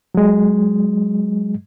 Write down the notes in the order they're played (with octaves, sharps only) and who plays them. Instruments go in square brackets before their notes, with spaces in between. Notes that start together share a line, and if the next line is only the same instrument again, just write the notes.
[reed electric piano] F#3 G#3